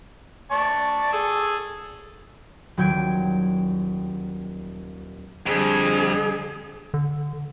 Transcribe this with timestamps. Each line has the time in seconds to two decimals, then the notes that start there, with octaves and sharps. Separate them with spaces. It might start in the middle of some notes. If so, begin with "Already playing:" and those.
0.51 D5 A5 C#6
1.13 G#4 A4
2.77 D#1 F#3 G5 G#6 D7
5.46 F2 D3 G3 G#4
6.94 D3